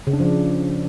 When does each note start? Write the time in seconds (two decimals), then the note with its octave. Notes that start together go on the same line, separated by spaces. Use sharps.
0.07 C#3
0.13 D4
0.20 F3